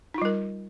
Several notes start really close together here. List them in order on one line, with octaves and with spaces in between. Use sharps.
D#4 F4 G3 A#4